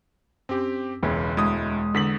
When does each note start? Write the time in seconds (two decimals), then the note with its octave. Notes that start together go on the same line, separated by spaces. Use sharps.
0.49 F#2 C4 G4
1.03 E1 C#2 E3 E4
1.37 D2 G#3 E4 D#6
1.94 E2 D3 B6 F#7